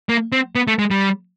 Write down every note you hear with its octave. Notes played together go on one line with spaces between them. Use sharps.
A#3
C4
B3
A3
G#3
G3